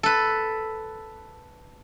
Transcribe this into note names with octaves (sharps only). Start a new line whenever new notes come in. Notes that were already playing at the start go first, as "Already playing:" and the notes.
A4 B4